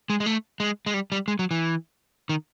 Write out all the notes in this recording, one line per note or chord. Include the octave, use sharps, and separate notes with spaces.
G#3
G#3
A3
G#3
G#3
G3
G3
G#3
F#3
E3
D#3